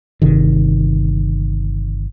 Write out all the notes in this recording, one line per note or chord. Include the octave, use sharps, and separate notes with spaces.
G1 C3 D#3